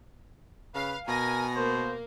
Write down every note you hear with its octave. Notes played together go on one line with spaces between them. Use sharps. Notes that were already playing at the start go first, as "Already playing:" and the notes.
C#3 B4 F5
B2 A#4 G#5 A#6
A#3 C5